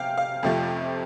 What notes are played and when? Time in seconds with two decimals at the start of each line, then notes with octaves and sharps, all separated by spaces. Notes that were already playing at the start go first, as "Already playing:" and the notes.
Already playing: C3 F5 G5
0.17 F5
0.43 F2 C3 F3 A3